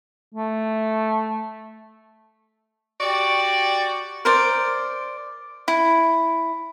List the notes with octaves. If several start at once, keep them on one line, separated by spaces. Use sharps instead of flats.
A3
F#4 G4 D5
A#4 C5 D5
E4